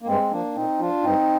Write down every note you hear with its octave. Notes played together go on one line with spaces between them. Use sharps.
A#3
G2 G#3 C4
F3 A#3 D4
A#2 C4 D#4
F3 D4 F4
G2 C4 D#4